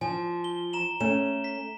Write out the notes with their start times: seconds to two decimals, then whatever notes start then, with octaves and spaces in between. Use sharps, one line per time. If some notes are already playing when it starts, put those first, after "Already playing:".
0.01 F3 G#5
0.44 G7
0.73 A#5 E7 F#7
1.00 A3 C#4 E7
1.44 B6